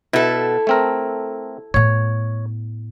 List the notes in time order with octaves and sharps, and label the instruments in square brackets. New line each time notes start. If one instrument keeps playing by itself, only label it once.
[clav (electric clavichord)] B2 [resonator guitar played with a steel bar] E4 A4
[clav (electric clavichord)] A3 C4 A#4
[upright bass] A2 B3 [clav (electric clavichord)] C#5